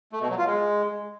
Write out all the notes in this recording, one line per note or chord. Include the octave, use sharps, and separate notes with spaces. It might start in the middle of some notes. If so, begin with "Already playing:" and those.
A3
B2
F#3
F4
G#3